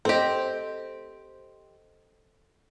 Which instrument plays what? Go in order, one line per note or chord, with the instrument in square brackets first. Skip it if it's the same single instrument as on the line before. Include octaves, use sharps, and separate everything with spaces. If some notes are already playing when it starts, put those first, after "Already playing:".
[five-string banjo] C4 G4 [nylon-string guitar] A4 C5 D#5